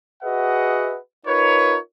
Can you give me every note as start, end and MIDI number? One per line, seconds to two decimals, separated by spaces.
0.23 0.97 66
0.23 0.97 68
0.23 0.97 71
0.23 0.97 75
0.23 0.97 76
0.23 0.97 78
1.26 1.78 63
1.26 1.78 65
1.26 1.78 70
1.26 1.78 71
1.26 1.78 73